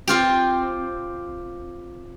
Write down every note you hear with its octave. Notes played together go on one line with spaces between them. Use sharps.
C4 F4 G4